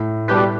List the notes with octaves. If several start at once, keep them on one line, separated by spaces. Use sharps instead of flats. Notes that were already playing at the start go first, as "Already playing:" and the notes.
Already playing: A2
B2 G3 D4 G4 B4